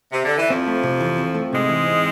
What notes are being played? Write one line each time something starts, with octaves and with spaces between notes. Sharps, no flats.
C3
D3
E3
F2 F3 C4
A3
C3
E3
C4
A3
G#2 C3 G#3
E3
C4